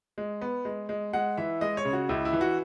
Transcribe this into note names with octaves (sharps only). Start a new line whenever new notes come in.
G#3
B3
G#3
G#3
G#3 F#5
E3 E5
G#3 D#5
C#5
C#3
F#4
C#2 E4
E4
E3
F#4